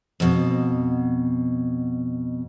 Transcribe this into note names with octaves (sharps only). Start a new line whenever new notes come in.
F2 B2